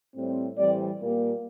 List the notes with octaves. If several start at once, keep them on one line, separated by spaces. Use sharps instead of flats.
A2 G3 C4
A2 E3 G3 C4 D5
A#2 G3 A#3